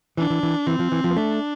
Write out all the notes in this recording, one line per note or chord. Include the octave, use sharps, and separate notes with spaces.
E3 D4
E3
E3
E3 C4
F3
E3
F3
B3
A3 D4